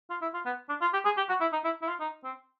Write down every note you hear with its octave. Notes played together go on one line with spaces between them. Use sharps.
F4
E4
F4
B3
D4
F4
G4
G#4
G4
F#4
E4
D#4
E4
E4
F4
D#4
C4